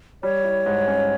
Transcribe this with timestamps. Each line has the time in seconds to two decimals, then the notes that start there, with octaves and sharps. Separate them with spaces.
0.23 G3 C#5
0.44 E4
0.66 G#2
0.88 C#4